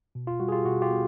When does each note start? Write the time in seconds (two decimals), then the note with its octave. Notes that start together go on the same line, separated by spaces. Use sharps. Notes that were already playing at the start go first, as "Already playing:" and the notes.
0.15 B2
0.27 F4
0.40 G3 F#4
0.48 G#4
0.52 F4 G4
0.65 B2 F#4
0.82 F4 G4
0.90 B3